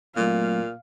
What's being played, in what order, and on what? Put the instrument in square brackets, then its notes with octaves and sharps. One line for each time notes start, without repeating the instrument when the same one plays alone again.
[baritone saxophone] A#2 [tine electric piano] F#3 A3 C4 [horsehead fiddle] F5